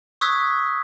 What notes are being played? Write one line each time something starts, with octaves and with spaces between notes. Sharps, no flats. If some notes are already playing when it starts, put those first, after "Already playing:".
C#6 D#6 E6 F#6 G#6 B6